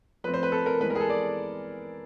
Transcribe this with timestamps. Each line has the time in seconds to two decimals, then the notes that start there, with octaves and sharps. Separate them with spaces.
0.24 F3 A3 C4 B4
0.34 C5
0.43 B4
0.52 A4
0.66 A#4
0.80 E3 G#3 B3 B4
0.90 A#4
0.95 G#4
1.00 A4
1.10 D5